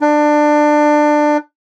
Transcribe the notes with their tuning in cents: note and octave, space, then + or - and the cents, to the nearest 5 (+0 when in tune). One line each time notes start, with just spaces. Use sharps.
D4 +20